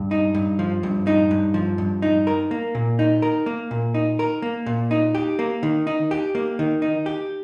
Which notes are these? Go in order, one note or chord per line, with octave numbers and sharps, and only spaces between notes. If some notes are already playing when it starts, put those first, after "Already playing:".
Already playing: G2
D#4
G2
F3
G2
D#4
G2
F3
G2
D#4
A#4
A#3
A#2
D#4
A#4
A#3
A#2
D#4
A#4
A#3
A#2
D#4
G4
A#3
D#3
D#4
G4
A#3
D#3
D#4
G4